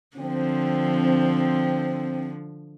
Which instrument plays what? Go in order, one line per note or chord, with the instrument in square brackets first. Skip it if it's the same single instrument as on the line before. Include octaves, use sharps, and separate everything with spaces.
[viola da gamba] D3 F3 [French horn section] C4